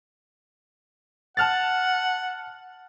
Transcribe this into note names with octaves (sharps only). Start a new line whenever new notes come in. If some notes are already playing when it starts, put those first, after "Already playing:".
F#5 A5 F6 A6